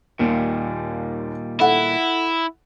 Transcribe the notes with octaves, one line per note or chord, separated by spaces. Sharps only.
D#2 A#2 D#3 G3
E4 A4 F#5